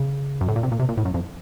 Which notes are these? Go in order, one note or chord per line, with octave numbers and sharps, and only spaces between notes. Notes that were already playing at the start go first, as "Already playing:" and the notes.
Already playing: C#3
F#2
A2
A#2
C3
A#2
C3
A#2
A2
F#2
F2